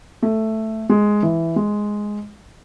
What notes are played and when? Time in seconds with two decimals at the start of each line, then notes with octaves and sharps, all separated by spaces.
0.23 A3
0.90 G#3
1.23 E3
1.56 G#3